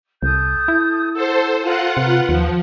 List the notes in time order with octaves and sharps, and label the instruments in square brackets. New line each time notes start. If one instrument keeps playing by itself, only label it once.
[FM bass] C2 [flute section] A4 D#6 G6
[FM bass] E4
[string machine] A4 C5 [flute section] F#5 E6
[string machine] F4 F#5 [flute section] A4 A#4 G#5
[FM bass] C3 [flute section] A#4 B4
[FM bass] D#2 [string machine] F3